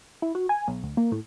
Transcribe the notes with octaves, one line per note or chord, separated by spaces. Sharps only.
E4
F#4
G#5
B1
D2
A#3
A2